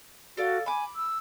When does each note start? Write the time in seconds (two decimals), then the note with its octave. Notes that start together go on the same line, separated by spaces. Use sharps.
0.37 F#4 A4 D5 F5
0.66 G#5 B5 D6
0.96 E6